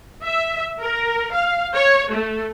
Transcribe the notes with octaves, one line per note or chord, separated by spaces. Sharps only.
E5
A#4
F5
C#5
A3